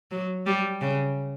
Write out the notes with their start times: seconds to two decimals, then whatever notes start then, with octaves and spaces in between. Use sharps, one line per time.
0.11 F#3
0.46 G3
0.81 C#3